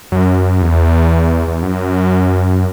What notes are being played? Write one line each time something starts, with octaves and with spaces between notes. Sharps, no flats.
F#2
E2
E2
F#2